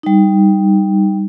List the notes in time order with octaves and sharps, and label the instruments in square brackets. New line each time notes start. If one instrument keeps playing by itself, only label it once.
[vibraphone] G3 D#4